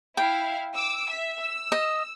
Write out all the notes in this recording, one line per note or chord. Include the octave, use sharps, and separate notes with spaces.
E4 F5 G5
D6 E6
E5
E6
D#5